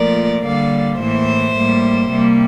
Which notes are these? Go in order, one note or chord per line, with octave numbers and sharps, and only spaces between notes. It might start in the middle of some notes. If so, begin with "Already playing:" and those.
Already playing: A#2 F3 A3 A#4 D5
D3 G3 A#3 D5 F5
A2 E3 A#3 C5 E5
A2 G3 A#3
C3 G3 A#3